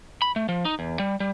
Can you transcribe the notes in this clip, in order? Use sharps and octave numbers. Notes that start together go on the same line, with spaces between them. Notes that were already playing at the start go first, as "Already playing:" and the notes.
B5
A3
F3
D#4
E2
G3
G3